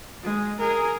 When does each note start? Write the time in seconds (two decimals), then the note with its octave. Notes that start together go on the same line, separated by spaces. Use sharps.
0.24 G#3
0.59 G#4 A#4